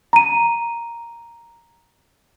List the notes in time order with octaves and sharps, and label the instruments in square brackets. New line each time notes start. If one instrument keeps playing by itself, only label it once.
[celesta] A#5 D#7